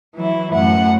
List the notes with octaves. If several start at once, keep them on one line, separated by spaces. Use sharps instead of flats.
E3 F#3 E4
F#2 A2 F#5